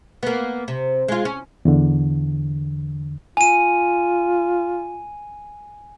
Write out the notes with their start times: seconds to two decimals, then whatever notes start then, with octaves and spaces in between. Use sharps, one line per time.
0.23 A#3 B3
0.68 C3
1.08 G#3 F4
1.25 C#4
1.65 E2 D3
3.37 F4 G#5 D#7